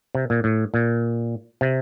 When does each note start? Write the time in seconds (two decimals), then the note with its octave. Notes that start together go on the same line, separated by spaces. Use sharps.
0.15 C3
0.30 A#2
0.44 A2
0.74 A#2
1.61 C3